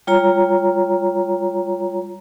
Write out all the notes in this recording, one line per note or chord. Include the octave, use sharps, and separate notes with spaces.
G3 F4 C#5 A#5